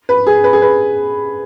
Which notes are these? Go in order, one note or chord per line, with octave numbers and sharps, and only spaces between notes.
B4
G#4
B4
G#4
B4